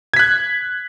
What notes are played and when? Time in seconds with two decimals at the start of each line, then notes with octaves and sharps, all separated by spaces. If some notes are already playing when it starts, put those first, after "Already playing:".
0.14 G#6
0.16 B6
0.19 F#6